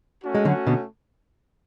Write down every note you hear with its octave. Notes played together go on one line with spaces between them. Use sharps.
A3 C#4 F#4
G#3
D3 F#3
B2 D3